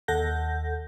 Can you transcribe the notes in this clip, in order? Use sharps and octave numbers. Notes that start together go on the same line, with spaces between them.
D#2 A4 F#5 G6 A#6